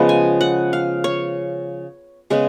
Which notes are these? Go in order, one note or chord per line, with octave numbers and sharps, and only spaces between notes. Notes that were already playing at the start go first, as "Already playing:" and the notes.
Already playing: C#3 F3 G#3 B3 F#5
G#5
F#5
F5
C#5
C#3 G#3 B3 G#4